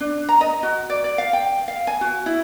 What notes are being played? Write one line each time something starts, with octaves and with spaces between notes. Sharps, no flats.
D4
A#5
D#5
F#4
D5
D5
F5
G5
F5
G#5
F#4
E4